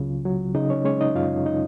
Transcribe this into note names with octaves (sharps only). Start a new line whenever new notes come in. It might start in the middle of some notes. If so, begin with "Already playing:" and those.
Already playing: C#2 C#3 F#3 F4
F#3
C#3 D#4 D#5
C#4 C#5
G#3 C#4 C#5
D#4 D#5
F#2 F4 F5
D#4 D#5